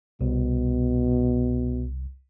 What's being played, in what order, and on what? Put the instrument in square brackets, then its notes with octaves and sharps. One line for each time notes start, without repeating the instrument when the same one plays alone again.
[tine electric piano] C2 [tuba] B2